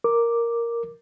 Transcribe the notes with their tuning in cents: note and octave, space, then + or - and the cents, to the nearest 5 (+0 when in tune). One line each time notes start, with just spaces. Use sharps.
A#4 +0 D6 +0